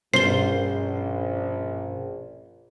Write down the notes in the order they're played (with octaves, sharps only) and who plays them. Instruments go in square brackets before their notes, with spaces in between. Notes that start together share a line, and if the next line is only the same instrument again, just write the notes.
[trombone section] A#1 [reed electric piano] G2 B2 C#4 [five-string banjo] F4 C5 [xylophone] C7 G7